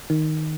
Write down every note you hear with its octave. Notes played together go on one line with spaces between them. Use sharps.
D#3